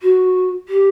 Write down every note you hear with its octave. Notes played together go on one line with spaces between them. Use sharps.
F#4
G4